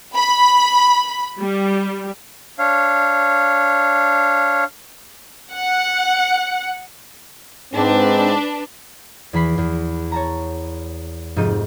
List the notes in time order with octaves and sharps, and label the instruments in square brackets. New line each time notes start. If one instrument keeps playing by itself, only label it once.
[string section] B5
G3
[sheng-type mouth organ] D4 C#5 F5
[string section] F#5
[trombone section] G#2 C4 [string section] D4 B4
[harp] E2 E3 B5 C7
E2
C#5 A5 A#5
F1 G#2 C4 D#4 F4 D#7